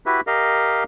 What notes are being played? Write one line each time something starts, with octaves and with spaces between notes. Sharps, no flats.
E4 F#4 G4 B4 E5
G4 A#4 D#5 F5